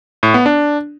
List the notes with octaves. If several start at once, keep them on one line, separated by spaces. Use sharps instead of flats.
A2
B3
D4